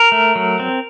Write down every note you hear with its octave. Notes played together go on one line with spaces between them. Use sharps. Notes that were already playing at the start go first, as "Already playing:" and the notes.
Already playing: A#4
A3
F#3
C4